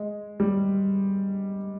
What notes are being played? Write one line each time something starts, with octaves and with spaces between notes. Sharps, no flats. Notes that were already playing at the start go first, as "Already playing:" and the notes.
Already playing: G#3
G3